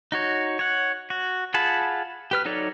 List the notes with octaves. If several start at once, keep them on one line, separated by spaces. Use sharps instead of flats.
D#4 F#4 C#5
C#5 F#5
F#4
F4 G#4 F#5 A5 B5
G4 B4 F6
F#3 D#4 A4 C#5 D5